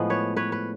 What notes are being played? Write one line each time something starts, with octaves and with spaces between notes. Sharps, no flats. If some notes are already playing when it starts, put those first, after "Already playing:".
Already playing: A2 F3 G#3 B3
B4 C#5
B4 C#5
B4